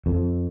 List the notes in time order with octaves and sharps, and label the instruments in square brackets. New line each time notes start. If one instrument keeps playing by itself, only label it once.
[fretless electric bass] F2